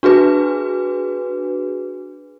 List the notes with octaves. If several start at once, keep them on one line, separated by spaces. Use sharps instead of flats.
D4 F#4 G#4 B4